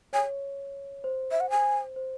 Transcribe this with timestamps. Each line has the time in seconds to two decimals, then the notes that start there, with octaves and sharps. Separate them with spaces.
0.13 C#5 G#5
1.04 C5
1.31 E5
1.40 F#5
1.50 G#5
1.96 C5